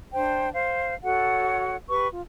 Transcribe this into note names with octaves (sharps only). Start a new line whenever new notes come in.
D4 C5 G5
C5 F5
F#4 A4 C#5 F#5
G4 B4 C#6
F4